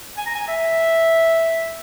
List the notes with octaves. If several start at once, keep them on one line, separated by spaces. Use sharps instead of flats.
G#5
A#5
G#5
E5